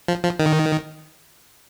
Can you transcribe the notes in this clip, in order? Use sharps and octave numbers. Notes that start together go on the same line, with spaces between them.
F3
F3
D#3